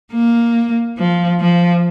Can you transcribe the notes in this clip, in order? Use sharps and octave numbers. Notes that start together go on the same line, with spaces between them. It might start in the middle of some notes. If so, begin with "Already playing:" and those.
A#3
F3
F3